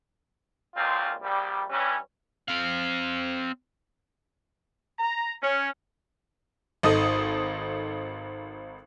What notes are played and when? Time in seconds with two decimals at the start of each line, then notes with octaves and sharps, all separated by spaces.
0.75 G#1 C#2 A#2 C4 F4
1.21 A#1 G3
1.70 G2 E3 G3 C#4
2.48 C4 F5
4.99 A#5
5.42 C#4
6.83 G#1 D#4 A4 D#6